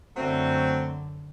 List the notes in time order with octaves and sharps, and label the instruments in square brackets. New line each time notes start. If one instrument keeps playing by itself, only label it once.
[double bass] F#2 D3 [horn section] F#3 A3 C4